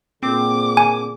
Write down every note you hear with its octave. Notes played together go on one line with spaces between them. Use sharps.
A#2 D3 C4 G#4 D6
G#5